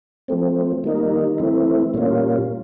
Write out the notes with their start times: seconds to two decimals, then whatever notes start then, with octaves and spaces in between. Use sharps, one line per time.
0.28 F3 A3 C4
0.84 D#3 G3 A#3 D#4
1.38 E3 A3 C4 E4
1.94 A#2 G3 A#3 C#4 F4